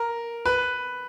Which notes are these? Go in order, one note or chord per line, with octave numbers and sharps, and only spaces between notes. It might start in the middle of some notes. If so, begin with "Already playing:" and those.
Already playing: A#4
B4